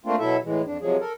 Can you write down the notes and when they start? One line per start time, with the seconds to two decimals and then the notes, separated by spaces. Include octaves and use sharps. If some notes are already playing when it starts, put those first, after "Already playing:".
0.05 A3 A#3 C4 D4 F4
0.19 B2 F#3 E4 A4 E5
0.44 A2 E3 G#3
0.66 F2 D4
0.81 C3 F3 F#3 G#3 G#4
1.00 A4 A#4